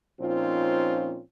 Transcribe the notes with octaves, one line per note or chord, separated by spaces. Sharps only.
A#2 F3 C4 C#4 D#4 F4